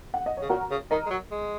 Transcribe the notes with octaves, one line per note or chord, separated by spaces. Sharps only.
F#5
D#5
C#3 C#5
A#2 F#4 A#4
C#3
D#3 A#4 D#5
G#3
F#3
G#3